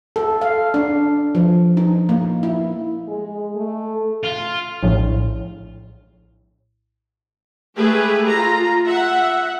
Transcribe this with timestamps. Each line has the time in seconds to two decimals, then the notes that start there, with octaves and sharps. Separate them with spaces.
0.16 A4
0.41 F5
0.74 D4
1.35 F3
1.77 D#4
2.09 A#3
2.43 E4
3.08 G#3
3.55 A3
4.23 F4
4.83 A#1 A2
7.76 G#3 A3 G4 G#4 B4
8.27 F4 A#5
8.86 E5 F#5